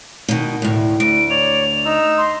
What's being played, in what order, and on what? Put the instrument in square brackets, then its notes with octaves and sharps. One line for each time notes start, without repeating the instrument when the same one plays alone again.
[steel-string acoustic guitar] B2 D#3
D2 A2
[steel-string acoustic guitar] D2 [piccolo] D7
[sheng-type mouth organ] C#5 D5 [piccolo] F7
[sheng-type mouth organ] D#4 E6
[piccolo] C6